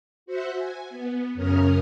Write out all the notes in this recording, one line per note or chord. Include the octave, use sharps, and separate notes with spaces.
F#4 C5 E5 F#5
G#5
B3
F#2 C#3 C#4 A#4 D#6 F6